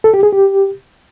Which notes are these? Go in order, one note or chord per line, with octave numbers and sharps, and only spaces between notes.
A4
G4
G#4
G4